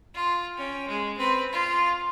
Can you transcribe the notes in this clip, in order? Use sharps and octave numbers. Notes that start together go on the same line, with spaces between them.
F4
C#4 G5
G#3
C4 B4
F4